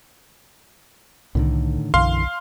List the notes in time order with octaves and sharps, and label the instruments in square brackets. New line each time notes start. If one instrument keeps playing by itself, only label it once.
[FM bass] C2 [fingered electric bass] A2 D3 D#3
[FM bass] B1 [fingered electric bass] F#2 D3 E3 [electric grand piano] F5 C6